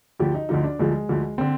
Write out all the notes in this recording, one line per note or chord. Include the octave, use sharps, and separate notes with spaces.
D2 D3 F3 G4
D#4
D2 D3 F3 D#4
D4
D2 D3 F3 G#3
D2 D3 F3
D3 C4